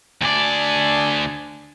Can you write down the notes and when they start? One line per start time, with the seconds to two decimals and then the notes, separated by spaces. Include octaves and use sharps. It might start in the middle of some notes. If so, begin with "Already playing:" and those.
0.22 D2 D4 D5 G#5